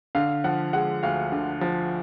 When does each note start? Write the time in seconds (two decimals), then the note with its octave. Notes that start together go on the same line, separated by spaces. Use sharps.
0.15 D3 F5
0.44 F3 F#5
0.73 G#3 F#5
1.03 D2 F5
1.32 D3
1.61 F3